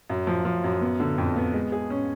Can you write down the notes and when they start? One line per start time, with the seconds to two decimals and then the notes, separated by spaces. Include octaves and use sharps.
0.10 F#2
0.27 F3
0.45 F3
0.64 F#2
0.81 B3
1.00 D3
1.18 F2
1.36 B3
1.54 G#3
1.72 G#4
1.90 C#4